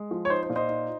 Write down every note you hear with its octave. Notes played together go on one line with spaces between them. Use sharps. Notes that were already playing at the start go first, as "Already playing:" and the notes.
Already playing: G#3
F3
C#5
D#4 C5
C5
A#2
C5 D#5
D#4